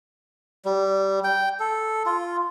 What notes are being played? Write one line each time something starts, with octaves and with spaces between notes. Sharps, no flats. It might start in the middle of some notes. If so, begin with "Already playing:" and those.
G3
G5
A4
F4